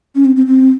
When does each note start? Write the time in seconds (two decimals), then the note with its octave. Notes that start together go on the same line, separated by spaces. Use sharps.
0.16 C#4
0.25 C4
0.36 C4
0.46 C4